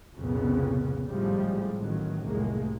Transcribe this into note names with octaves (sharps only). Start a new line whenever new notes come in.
C2 F2 A#2 C#3 B3
G#1 A2 F3 G3 G#3
A1 D#3 F#3
F1 C2 A2 G#3 A#3